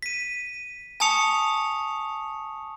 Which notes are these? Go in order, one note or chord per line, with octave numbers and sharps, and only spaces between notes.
B6 D#7
G#5 A5 C#6 D#6 C#7 F7